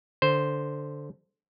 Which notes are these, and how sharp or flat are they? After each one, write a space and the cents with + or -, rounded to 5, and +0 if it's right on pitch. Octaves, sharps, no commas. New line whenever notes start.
D3 +0 C5 +0